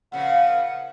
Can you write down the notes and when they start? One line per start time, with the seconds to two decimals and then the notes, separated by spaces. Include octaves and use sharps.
0.12 A#2 C#3 F3 F#5